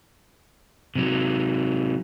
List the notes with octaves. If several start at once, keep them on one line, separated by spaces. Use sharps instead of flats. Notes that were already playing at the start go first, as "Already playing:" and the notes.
C3 F#3